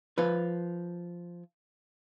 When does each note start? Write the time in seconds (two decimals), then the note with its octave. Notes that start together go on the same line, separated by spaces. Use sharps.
0.18 F3 B4